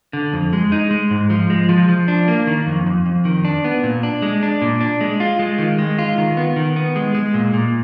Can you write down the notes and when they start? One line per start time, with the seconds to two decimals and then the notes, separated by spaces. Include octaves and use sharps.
0.13 D3
0.33 F2
0.53 G#3
0.72 D#4
0.91 G#3
1.11 G#2
1.30 F3
1.50 G#3
1.69 F3
1.89 F3
2.08 D4
2.28 A#3
2.47 D#3
2.67 F2
2.86 F2
3.06 F2
3.25 D#3
3.45 D4
3.64 B3
3.83 A#2
4.03 D4
4.22 G#3
4.43 D4
4.61 A#2
4.81 D4
5.01 G#3
5.20 F4
5.39 G#3
5.59 D#3
5.79 G#3
5.99 F4
6.18 D#3
6.37 B3
6.56 D#3
6.76 B3
6.96 G#3
7.15 G#3
7.34 A#2
7.54 A#2